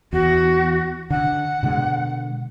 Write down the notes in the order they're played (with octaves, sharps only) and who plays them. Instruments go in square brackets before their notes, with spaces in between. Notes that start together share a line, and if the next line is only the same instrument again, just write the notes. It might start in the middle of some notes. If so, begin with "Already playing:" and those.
[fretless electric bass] E2 [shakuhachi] F#4
[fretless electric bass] D3 [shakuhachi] F#5
[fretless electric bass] B2 D3 G#3